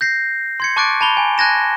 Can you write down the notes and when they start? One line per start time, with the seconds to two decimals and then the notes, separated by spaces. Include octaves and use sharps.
0.01 G6 A#6 C7
0.60 C6 G#6 C#7
0.76 A5 C#6 D6 F#6 A6 D7
1.01 A5 B5 G7
1.17 G#5
1.38 A5 F#6 G#6 A#6 E7